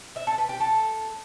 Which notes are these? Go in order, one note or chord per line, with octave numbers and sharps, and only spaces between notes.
E5
A4
B4
G4
A4